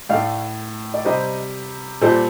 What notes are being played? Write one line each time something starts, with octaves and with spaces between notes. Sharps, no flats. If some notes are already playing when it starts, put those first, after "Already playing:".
A2 A3 D5 F5
D5
C3 G3 C5 D#5
A#2 G3 A4 C5